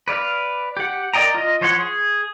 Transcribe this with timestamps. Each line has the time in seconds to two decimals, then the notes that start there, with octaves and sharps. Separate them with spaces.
0.08 B4 D5 F5
0.77 G4 F#5
1.14 A#4 D5 D#5 G5 A#5
1.34 F4 D#5
1.61 F3 C5 C#5 F#5 C6
1.78 G#4